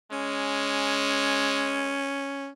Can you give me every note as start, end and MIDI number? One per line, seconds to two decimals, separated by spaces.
0.12 1.97 56
0.12 2.48 61